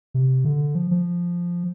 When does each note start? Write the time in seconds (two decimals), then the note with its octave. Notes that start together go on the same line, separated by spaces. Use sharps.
0.14 C3
0.45 D3
0.75 F3
0.91 F3